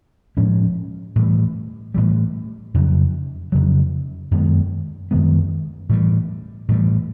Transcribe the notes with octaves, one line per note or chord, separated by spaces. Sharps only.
A2 F3 G#3 C#4
A2 E3 G3
A2 E3 G3
F2 C#3 F#3
F2 C#3 F#3
F#2 D#3 G#3 B3
F#2 D#3 G#3 B3
A2 E3 G3
A2 E3 G3